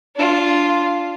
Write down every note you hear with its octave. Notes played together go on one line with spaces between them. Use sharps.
D4 F4